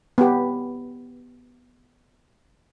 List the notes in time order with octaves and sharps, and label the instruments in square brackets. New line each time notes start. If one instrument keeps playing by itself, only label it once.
[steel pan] B3 G4